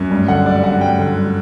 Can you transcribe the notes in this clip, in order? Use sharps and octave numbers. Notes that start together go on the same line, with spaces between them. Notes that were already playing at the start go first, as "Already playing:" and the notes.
Already playing: F#2
G2
D3 F#5
G3 D5
G2 F#5
G2 G5
D3
G3